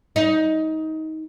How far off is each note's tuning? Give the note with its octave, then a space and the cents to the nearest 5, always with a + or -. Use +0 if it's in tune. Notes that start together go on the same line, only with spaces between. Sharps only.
D#4 +20